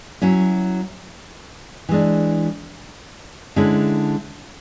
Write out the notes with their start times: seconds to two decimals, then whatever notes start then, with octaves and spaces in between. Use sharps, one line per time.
0.22 F#3 C#4 E4
1.89 E3 G#3 D4
3.56 D3 G#3 C#4 E4